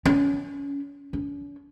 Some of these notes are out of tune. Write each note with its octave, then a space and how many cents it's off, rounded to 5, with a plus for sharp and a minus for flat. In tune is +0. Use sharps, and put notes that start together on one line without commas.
C#4 +25
C#4 +45